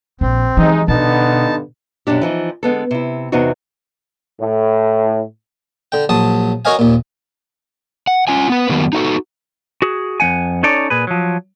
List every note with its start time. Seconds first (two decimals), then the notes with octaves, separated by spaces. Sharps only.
0.21 A#1 C4
0.57 C3 E3 F#3 G#3 D#4
0.88 G2 B2 D3 B3 D#4 A5
2.07 F#2 B2 D4 G4
2.22 E3 F3 D#4
2.63 D3 G#3 B3 A4
2.91 C3 E4
3.32 E2 C3 B3 C4 D#4 F#4
4.41 A2
5.92 D3 G5
6.09 A#1 F#3 A5 D#6
6.65 F#4 A#4 C#5 D#5 F5 G#5
6.79 D#2 A#2
8.07 F#5
8.28 C#4 F4 G#5
8.50 B3 B4
8.70 D#3 F#3 G3 A#3 B3
8.93 D#4 F#4 A4
9.82 F#4 G#4
10.20 F2 A#3 F#5 G#5
10.63 C#4 D#4 A4 C#5 D5
10.90 A#2 G#4 B4
11.07 F3 F#3